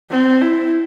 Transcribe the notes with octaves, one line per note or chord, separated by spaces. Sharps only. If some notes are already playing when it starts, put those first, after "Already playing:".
C4
E4